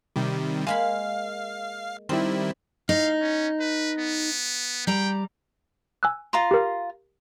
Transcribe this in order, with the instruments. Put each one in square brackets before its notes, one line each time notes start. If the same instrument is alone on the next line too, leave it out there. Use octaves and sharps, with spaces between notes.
[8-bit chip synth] C3 D#3 G3
[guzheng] G#3 A#3 B5 [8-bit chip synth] F5
[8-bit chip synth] D#3 G3 E4 [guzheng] C4
[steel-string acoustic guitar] D#4 [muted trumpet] F5
[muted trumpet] C#4
B4
B3
[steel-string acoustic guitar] G3 A#5 [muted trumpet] G5
[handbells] G#5 E6 F#6
[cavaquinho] F4 A#5 C6
[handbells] G4 A#4